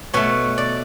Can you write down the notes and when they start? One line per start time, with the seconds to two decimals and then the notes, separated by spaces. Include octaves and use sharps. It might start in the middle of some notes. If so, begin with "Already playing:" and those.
0.14 B2 A3 C#5
0.58 D5